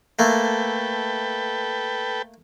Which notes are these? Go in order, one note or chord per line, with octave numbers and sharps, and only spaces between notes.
A3 A#3 A4 B4 G5